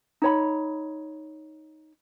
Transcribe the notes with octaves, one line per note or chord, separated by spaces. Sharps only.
D#4 C#5 B5